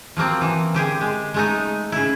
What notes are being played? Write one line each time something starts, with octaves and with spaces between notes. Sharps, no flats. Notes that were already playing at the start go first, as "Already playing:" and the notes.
F3 F#3 A#3 C4
E3
D3 G4 G#4
G#3
G#3 A3 D#4
C#3 E4